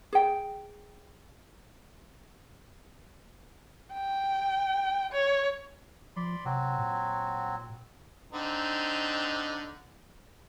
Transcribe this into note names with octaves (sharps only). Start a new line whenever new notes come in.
G#4 G5
G5
C#5
F3 D5 B5 C6
C3 F#3 C4 F#4
A#2
D3 C4 D#4